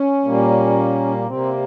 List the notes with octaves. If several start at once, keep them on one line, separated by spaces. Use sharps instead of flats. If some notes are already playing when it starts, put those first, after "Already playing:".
Already playing: C#4
A#2 G3 A#3
C3 G3 A#3 C4